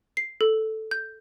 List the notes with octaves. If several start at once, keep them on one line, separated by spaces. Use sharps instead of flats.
C7
A4
G6